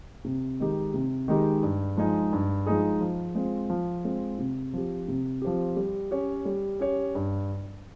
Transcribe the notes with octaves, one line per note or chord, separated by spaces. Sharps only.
C3
D#3 G#3 D#4 G4
C3
D#3 G#3 D#4 G4
G2
F3 G#3 D#4 G#4
G2
F3 G#3 D#4 G#4
F3
G#3 C4 F4
F3
G#3 C4 F4
C3
F3 C4 G4
C3
F3 C4 G4
G3
C#4 G4 C#5
G3
C#4 G4 C#5
G2